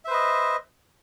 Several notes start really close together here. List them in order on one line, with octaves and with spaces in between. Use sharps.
E5 C5 B4 D#5